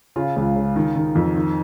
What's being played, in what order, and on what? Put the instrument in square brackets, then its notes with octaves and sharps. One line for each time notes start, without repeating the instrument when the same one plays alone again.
[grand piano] C#3 F4
C#2
C#3
D#3
D#3
F2
D#3